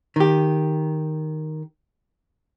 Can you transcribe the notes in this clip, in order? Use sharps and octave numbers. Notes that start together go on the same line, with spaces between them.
D#3 G4